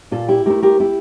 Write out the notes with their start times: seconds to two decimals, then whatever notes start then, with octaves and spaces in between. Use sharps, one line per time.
0.11 A#2 F4 A4
0.28 E4 G4
0.46 A3 E4 G4 A#4
0.62 G4 A#4
0.80 E4 G4